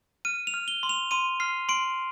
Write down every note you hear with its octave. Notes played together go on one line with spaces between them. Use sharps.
F6 D#7
F7
F6
G7
C6
F7
C6 D#7
F6 C7
C6 D7